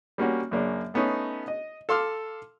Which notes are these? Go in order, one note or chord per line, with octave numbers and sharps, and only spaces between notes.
G3 A#3 C#4 F#4
F#2 C#3 A#3 D4
A3 B3 C#4 D#4
D#5
A4 F5 C6 D6 E6 F6